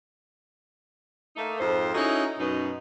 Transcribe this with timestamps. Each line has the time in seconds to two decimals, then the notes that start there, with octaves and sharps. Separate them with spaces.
1.36 A3 A#3 D#4
1.60 F2 G#2 C5
1.95 C#4 D#4 E4 F#4 G#4 A4
2.39 F#2 B2 D#4